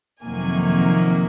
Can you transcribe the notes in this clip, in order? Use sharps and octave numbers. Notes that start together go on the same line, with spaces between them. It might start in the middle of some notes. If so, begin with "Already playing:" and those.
F2 C3 D#3 F#3 A#3 G#5